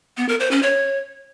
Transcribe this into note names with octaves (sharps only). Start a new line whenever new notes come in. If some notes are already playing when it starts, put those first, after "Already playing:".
B3
A#4
C5
C#4
C#5